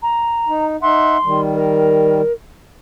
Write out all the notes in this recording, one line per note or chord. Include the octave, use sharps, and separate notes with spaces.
A#5
D#4
D#4 E5 F#5 C6
D#3 G3
A#4